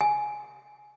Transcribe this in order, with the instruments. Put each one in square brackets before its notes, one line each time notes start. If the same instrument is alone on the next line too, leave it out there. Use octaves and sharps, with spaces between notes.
[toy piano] G#5